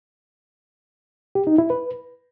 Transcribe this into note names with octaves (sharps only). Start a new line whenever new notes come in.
G4
D#4
E4
B4